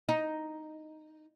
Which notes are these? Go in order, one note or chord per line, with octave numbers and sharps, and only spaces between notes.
D#4